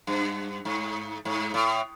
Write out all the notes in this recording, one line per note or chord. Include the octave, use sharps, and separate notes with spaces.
G2
G#2
G#2
A2